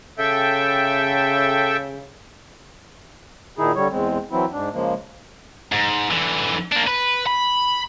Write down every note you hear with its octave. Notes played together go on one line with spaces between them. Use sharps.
C#3 A4 E5 G5
A#2 D#3 D#4 E4 G#4
D3 G3 C#5
E2 G#3 C4
E3 F#3 C4 E4
G#2 D4
C#3 F3 G#3 A#3
G#2
D3 E3
A#3 D4
B4
B5